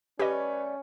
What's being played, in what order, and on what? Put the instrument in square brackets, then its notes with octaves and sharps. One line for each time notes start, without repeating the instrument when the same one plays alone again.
[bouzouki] G3 A3 [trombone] C#4 [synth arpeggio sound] G4 D#5 [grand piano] B4 C#5